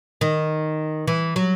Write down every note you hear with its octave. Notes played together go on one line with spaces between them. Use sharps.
D#3
E3
F#3